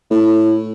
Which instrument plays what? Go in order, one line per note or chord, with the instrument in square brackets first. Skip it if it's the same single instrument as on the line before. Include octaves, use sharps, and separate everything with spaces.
[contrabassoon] A2